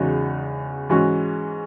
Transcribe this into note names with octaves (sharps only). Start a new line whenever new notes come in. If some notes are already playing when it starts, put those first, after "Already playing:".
Already playing: E2 C#3 G#3 D#4 F#4
G#2 E3 G#3 C#4 F#4